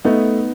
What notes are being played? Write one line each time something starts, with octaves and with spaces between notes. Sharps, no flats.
A3 B3 D#4